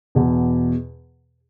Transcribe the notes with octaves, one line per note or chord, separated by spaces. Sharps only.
E2 B2